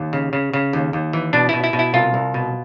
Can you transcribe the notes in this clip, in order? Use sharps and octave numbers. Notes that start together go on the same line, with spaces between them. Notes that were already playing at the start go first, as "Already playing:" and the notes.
Already playing: D#2
C#3
C#3
C#3
D#2
D#2
E3
B2 D4
B2 E4
E4
B2
E4
C2 F4
C2
B2